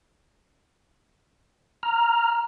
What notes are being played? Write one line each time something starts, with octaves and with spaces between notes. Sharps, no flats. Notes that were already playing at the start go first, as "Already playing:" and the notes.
A#5 F6